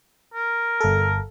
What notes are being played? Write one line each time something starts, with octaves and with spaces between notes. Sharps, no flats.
A#4
G1 A4